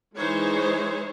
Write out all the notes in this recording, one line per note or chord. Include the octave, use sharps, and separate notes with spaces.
E3 G#3 D#4 G#4 C5 C#5